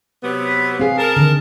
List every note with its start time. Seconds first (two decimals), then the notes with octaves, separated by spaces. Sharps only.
0.22 C3 F#3 B3
0.45 B4
0.80 C4 G#4 F5
0.98 A#4 A5
1.16 D3 D#3